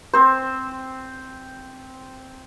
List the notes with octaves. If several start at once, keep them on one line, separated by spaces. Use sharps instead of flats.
C4 C5